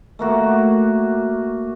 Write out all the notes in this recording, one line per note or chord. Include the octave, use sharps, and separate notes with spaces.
A3 A#3 F#4